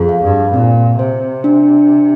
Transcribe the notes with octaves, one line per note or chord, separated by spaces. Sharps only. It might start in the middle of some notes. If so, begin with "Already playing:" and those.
Already playing: F2 G#4
F5
G2
A#2 C4
C3 C5
D4